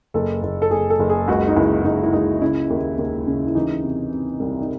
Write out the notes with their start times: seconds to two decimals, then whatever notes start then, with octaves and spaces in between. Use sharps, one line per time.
0.14 F#1 A4
0.43 F#1
0.62 A4
0.71 F#1 G#4
0.90 A4
1.00 F#1
1.09 G#4
1.28 C#2 F#4
1.48 D#4
1.56 C#2 E4
1.85 C#2 D#4
2.03 E4
2.13 C#2 D#4
2.42 C#3 E4
2.70 D#2
2.99 D#2
3.27 C#3
3.48 E4
3.55 E3 D#4
3.83 C3
4.12 C3
4.40 C2
4.61 D#4